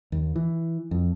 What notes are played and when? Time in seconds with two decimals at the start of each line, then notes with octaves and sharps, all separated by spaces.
0.12 D#2
0.36 E3
0.91 F2